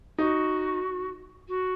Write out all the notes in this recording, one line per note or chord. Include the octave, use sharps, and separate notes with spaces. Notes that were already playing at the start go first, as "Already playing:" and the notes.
D#4 F#4
F#4